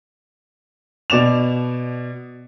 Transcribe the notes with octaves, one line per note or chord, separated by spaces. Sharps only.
B2 D5 E7 F7